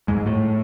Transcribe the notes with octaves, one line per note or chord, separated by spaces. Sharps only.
G#2 G#3
A2 A3